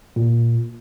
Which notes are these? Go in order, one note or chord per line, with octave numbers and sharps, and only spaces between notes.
A#2